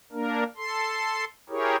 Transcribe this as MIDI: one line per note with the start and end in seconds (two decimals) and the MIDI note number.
0.12 0.44 58
0.12 0.44 62
0.12 0.44 70
0.57 1.25 69
0.57 1.25 84
1.50 1.76 64
1.50 1.76 67
1.50 1.76 68
1.50 1.76 70
1.50 1.76 73